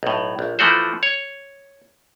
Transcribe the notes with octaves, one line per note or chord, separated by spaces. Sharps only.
B1 A2
A#1
E3 F3 A3 F#4 C5
C#5